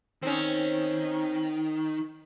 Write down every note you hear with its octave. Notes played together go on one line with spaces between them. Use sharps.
D#3 C4 C#4